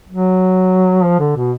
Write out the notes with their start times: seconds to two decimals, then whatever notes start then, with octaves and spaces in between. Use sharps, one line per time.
0.09 F#3
1.03 F3
1.19 D3
1.36 B2